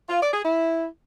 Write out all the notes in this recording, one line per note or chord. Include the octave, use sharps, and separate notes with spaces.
F4
D5
G#4
E4